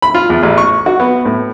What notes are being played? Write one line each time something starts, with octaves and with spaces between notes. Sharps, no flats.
B5
F4
E2
A1
C#6
F#4
B3
A2